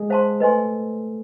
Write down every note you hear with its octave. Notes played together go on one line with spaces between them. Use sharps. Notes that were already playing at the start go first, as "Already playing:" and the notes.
Already playing: G#3 G#4
C5 F5 A5 C6
A3 A4 B4 D#5 G#5 C6